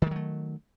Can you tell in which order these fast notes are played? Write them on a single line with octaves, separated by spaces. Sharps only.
D#3 G#3 F#3 A3